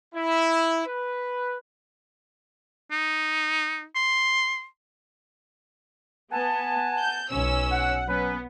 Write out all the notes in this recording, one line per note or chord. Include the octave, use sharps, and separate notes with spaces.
E4
B4
D#4
C6
B3 F#5 G#5 A5
G6
B1 C#4 E6
F#5
F#3 B3 C#4 B4